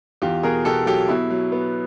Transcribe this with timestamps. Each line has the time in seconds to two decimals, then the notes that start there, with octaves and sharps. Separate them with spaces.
0.22 E2 F4 G4
0.43 B2 G#4 A#4
0.65 B2 G4 A4
0.86 F#3 G4 A4
1.08 B2 E4
1.30 F#3
1.52 B3